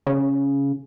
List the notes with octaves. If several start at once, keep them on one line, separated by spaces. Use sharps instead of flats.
C#3